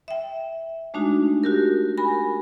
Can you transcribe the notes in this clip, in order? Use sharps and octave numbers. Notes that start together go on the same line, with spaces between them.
E5 G5
G#3 A3 D4 D#4 F#4
F#4 G4 A#4
A#4 G#5 B5